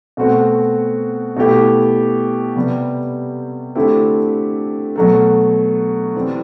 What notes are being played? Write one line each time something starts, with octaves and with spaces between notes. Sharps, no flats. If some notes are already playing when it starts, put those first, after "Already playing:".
B2 A3 C4 F#4
B2 A3 E4 G4
C3 G3 B3
D3 A3 C4 E4 G4
B2 F#3 A3
E3 G3 C4